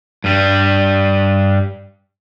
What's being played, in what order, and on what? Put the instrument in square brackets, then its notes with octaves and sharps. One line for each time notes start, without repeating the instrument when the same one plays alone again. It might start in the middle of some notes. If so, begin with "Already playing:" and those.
[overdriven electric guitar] G2 G3